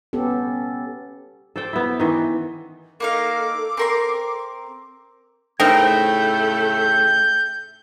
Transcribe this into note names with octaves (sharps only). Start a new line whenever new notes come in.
B3 C#4 G4 A4
A4 C5 D5 G5
B3 E4
D#3 E3
A#3 D#4 A4 F5 D6
C4 A#4 C6
A2 C#3 A3 C4 D#4 A#4 G5 G6